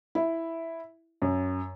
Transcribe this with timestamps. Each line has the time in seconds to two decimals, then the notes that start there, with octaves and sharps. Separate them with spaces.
0.15 E4
1.22 F#2